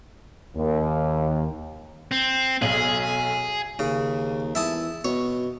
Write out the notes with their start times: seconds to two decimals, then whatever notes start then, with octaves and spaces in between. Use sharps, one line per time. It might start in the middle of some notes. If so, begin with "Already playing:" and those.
0.56 D#2
2.11 C4
2.62 B1 G#4 F#7
3.79 D#2 C#3
4.55 E2 E4 A5 D#6
5.05 B2 C#5